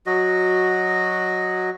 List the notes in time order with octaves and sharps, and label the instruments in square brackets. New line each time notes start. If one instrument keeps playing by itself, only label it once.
[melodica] F#3 F#4 D#5